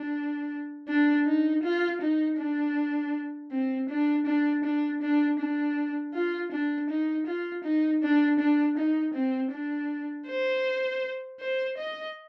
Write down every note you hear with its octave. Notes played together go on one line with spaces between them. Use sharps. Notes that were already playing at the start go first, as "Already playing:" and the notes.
Already playing: D4
D4
D#4
F4
D#4
D4
C4
D4
D4
D4
D4
D4
F4
D4
D#4
F4
D#4
D4
D4
D#4
C4
D4
C5
C5
D#5